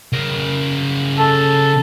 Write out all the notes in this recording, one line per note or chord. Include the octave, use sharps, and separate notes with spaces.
C#3 A#4
A4